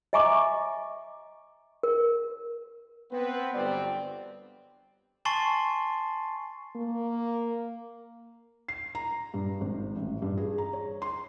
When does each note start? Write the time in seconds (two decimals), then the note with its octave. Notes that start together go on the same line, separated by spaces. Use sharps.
0.13 D#5 E5 G#5 A#5 C#6 D6
1.83 A#4
3.11 B3 C4 B4
3.54 G1 F2 F#3 G3 C4 D5
5.25 G#5 A5 C6 C#6 A6 C7
6.76 A#3
8.68 C7
8.95 A#5
9.34 G2
9.61 G#1
9.96 A1
10.22 G2
10.37 G#4
10.58 A#5
10.73 C#5
11.02 C6